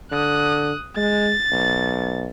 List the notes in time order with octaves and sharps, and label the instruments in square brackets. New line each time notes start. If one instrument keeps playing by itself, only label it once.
[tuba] D3 [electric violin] D#6 F#6
[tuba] G#3 [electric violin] A6
[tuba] B1